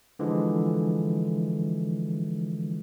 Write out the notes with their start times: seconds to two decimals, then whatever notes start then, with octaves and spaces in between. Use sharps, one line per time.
0.19 D3 E3 F3 G#3